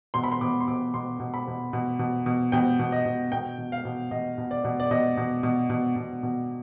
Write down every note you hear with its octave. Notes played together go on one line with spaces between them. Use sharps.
B2 C6
B5
C6
B2 D6
C6
B2 D6
B2 C6
B2
B5
B2
B2
B2
B2
B2 G5
B2
D#5
B2
B2 G5
B2
F5
B2
B2 D#5
B2
D5
B2
D5
B2 D#5
B2
B2
B2
B2
B2